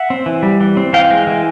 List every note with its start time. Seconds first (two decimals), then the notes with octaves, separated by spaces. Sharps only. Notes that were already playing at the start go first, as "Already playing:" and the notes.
Already playing: E5 F#5
0.10 C4
0.26 E3
0.43 G3
0.60 E3
0.77 C4
0.93 E3 F5 G5
1.10 G#3
1.27 E3